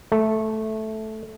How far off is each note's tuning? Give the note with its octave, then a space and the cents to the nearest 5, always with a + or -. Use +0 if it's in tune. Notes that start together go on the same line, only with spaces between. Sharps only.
A3 -10